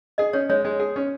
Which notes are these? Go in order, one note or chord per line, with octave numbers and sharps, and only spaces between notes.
G#4 D#5
C#4 C#5
G#3 C#5
G#3
G#4
C#4